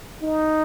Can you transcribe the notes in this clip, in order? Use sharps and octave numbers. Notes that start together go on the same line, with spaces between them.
D#4